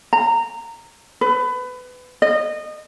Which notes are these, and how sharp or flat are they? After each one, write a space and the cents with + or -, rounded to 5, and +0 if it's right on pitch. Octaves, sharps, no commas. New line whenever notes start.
A#5 -15
B4 +25
D#5 -25